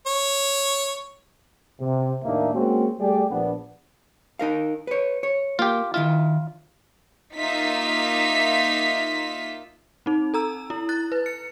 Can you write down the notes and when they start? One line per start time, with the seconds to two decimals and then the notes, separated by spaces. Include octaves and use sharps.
0.07 C#5
1.80 C3
2.23 D#2 A2 A#3 D4 D#4 E5
2.54 G#3 A#3 C4 C#4 F#4
2.99 G3 A3 G4 G#4 D5
3.30 A#1 B3 D4
4.39 D#4 A#4 F5
4.87 B4 C#5
5.23 C#5
5.59 A#3 F4 G4
5.94 D#3 E4 F4 E5
7.36 A#3 D#4 F4 E5 B6
10.06 C4 D#4
10.34 A4 A#5 E6
10.70 E4
10.89 F#6 A6
11.12 B4
11.26 C#7